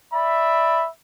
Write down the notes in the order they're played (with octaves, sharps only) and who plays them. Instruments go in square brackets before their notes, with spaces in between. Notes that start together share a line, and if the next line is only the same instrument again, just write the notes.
[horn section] D5 B5 [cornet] E5